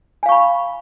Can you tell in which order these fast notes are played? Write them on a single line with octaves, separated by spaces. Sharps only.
G#5 F5 C#6 B5